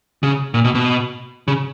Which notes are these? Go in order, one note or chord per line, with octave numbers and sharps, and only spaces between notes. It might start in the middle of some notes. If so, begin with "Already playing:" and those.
C#3
A#2
B2
B2
C#3